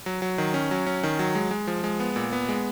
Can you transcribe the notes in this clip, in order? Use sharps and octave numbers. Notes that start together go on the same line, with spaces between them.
F#3
F#3
D#3
C#4
F#3
C#4
D#3
F#3
G#3
G#3
F3
G#3
B3
A#2
B3
G#3